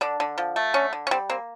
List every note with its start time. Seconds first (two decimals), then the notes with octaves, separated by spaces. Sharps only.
0.01 D3 D4
0.20 D3
0.38 F3
0.56 A3
0.74 D3 C#4
0.93 D3
1.07 C#4
1.11 G3 C4
1.30 A#3 C4